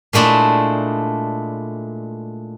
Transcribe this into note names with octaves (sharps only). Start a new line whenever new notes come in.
A#2 G#3 A3 D4 E4